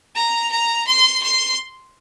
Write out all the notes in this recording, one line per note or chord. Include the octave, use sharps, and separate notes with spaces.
A#5
A#5
C6
C6